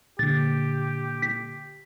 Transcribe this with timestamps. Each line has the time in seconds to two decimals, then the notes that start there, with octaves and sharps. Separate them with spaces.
0.19 A#2 D3 G4 A6
1.22 B6